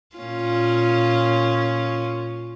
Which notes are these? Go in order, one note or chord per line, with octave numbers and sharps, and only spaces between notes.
A#2 C#4 F4